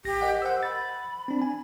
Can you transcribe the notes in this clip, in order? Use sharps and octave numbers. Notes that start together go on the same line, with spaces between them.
A1 G4 A#6
A#4 D#5 F#5
C5 F#5 E6
B5 A6
C4 D4
G#5